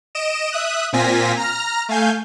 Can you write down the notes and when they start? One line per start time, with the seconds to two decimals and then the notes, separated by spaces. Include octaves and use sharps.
0.15 D#5 D7 E7
0.52 E5 D#6 F#6
0.93 A#2 C4 F4 G#5 A#6 B6
1.37 A#5 F6 A#6
1.89 A3 F5 G#5 G6